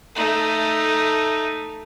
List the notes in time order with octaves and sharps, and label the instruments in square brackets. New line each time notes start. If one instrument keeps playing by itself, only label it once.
[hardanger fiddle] A3 D#4